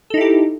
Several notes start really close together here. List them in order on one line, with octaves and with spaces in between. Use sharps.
A4 D#4 E4 G4